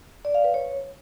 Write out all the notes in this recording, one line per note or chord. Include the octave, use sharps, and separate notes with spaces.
D5
F5
B4
C#5